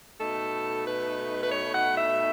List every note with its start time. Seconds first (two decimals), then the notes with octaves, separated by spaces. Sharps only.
0.19 B2 A3 D#4 A4
0.85 B4
1.42 B4
1.52 C#5
1.74 F#5
1.96 E5